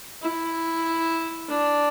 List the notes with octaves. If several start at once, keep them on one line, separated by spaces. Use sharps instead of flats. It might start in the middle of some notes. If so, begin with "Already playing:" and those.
E4
D4